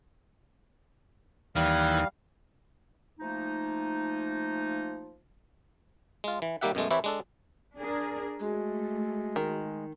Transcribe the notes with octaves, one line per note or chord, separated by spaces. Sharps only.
D#2 E3 G3 F5
F3 A3 A#3 D#4
G#3 F4
E3
D#3 G3 A#3 G4 E5 F#5
F#2 B2 G#3 A3
E3 C4 E4 G4 B4 C#5
G#3 D4 A4
D4 G#4 A#4
G#3 A3 F#4 G#4
D#3